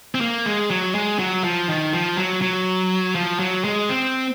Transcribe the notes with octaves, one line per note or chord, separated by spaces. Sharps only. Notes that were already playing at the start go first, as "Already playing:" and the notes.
C4
A#3
G#3
F#3
G#3
F#3
F3
D#3
F3
F#3
F#3
F3
F#3
G#3
C4